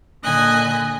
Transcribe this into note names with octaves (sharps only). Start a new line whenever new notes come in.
A#2 D3 D#5 G#5 F#6